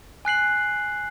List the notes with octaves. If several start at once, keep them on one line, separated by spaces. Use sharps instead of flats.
G#5 F#6 C7 F#7